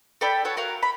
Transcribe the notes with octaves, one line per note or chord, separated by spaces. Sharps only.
A4 D5 G5 B5
F#4 A4 C#5
F#4 A#4 F5
B5